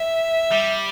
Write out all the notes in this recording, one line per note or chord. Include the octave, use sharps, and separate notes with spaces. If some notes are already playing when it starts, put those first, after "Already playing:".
Already playing: E5
G3